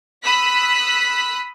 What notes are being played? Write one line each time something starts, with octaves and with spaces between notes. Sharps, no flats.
B5 D#6 E6 F#6 B6